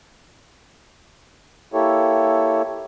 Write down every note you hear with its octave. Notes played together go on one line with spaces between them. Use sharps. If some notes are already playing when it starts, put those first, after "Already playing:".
A#3 E4 G4 A4 C#5